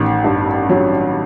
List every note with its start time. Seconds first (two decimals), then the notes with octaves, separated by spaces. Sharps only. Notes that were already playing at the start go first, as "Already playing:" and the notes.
Already playing: A1 D#3
0.24 G2
0.69 F#3